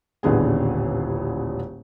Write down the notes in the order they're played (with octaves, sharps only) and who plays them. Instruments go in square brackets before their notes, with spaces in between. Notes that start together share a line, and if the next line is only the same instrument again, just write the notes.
[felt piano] D#1 A1 D3 B3 G#4